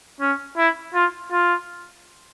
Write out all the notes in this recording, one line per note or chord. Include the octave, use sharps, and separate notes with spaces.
C#4
E4
F4
F4